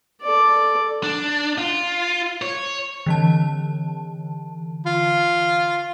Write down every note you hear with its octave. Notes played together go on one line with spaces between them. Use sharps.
A4 D5
D4
F4
C#5
D3 E3 A5
F4